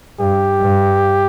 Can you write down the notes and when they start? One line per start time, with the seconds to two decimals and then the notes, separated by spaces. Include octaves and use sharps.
0.20 G2 G4
0.61 G2